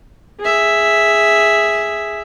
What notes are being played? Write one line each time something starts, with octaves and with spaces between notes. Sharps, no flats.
G#4 E5